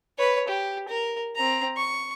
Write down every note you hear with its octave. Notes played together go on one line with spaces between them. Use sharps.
B4 C#5
G4
A#4
C4 A#5
C#6